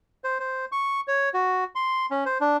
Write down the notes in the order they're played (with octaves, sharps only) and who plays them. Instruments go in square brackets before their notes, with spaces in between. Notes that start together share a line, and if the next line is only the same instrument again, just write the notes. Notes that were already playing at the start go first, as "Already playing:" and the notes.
[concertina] C5
C5
C#6
C#5
F#4
C6
C#4
C5
D4